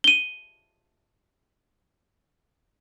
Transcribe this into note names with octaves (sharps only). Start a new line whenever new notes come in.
D#7 G7